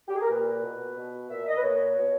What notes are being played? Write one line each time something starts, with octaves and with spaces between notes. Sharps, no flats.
G4
G#4
A#4
A#2 B4
B2
B2
A#2 E5
D#5
B4
A#2 C#5
B2